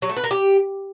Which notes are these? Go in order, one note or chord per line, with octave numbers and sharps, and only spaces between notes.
F#3
A3
B4
A#3
G4